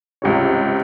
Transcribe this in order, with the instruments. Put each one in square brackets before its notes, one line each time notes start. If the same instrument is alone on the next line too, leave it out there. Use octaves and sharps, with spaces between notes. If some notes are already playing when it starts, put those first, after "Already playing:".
[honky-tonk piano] C#2 C3 C#5